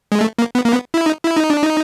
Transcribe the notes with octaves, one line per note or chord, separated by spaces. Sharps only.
G#3
A3
A#3
B3
A#3
B3
E4
D#4
E4
D#4
D4
D#4